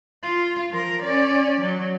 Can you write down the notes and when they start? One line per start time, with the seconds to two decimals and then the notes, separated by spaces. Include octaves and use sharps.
0.23 F4
0.71 F3 A#4
1.02 C#4 D5
1.60 F#3